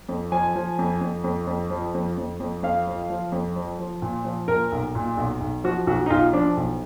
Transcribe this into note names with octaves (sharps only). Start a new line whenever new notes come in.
F2
F3 G#5
F3
F2
F2
F2
F2
F3
F2
F2
F2
F2 F5
F3
F3
F2
F3
F3
A#2
F3
A#2 A#4
B1
A#2
B1
B1
F3 F#4
B1 F#4
D#4
B1 F4
F3 D4
B1